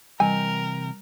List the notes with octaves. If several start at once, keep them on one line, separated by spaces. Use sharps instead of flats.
C3 E3 G3 A#4 G5 G#5